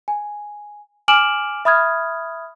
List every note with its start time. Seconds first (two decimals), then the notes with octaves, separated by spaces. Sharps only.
0.08 G#5
1.08 G#5 D6 F6 D7 E7 F#7
1.65 E5 B5 D#6 F6 G#6